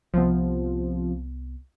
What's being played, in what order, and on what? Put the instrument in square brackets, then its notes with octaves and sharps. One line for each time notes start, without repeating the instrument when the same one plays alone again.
[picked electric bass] C2 B3 [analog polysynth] C3 F3